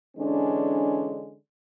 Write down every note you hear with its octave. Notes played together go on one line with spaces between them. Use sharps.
D3 E3 G#3 C#4 D4